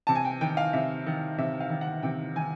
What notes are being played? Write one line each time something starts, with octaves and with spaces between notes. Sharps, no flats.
C3 A5
G#5
G5
D#3 G5
F5
C3 E5
D#3
C3 E5
F5
D#3
F#5
C3 G5
D#3 G#5